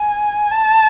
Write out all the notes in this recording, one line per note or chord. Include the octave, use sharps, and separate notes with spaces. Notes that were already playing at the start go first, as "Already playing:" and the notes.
Already playing: G#5
A5